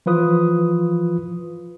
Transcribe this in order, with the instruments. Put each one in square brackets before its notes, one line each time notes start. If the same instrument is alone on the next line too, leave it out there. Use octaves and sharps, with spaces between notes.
[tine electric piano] E3 F3 F4 B4 D#6